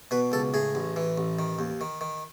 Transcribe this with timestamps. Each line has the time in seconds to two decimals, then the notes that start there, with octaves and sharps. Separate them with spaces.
0.11 B2 B4
0.32 C#2 A4
0.54 A2 G#4
0.75 A1
0.96 E3
1.18 A1
1.39 D#3
1.59 D#2
1.81 D#3
2.01 D#3